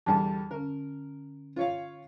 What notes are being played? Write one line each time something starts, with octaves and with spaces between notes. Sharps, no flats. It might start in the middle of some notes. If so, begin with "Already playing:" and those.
E2 D3 G3 A5
D3 C#4 A#4
F4 C#5 F5